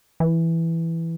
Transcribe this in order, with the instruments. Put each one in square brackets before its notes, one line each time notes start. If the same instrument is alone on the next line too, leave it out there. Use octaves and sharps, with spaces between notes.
[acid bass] E3